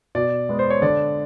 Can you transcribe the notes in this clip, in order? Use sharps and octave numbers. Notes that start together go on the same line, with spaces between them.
B2 D5
G#3 B3
C5
C#5
D3 D5